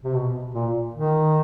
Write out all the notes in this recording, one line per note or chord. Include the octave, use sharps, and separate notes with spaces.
C3
B2
A#2
D#3